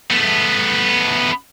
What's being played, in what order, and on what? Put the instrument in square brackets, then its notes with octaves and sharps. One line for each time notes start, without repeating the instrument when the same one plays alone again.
[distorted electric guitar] A3 B3